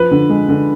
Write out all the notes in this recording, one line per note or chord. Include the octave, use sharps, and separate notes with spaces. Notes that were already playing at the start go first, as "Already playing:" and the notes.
Already playing: F3 B4
D3
G#3
D3